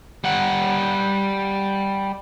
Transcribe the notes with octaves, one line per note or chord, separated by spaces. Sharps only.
G3 F#5